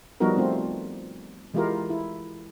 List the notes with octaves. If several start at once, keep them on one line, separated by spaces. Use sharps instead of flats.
F3 G3 B3 D#4 F#4 A#4
A3 C4 F4
E3 G#3 E4 F4 G4 A#4
E4